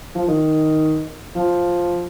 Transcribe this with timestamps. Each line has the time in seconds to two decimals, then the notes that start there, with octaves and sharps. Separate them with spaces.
0.15 F3
0.28 D#3
1.35 F3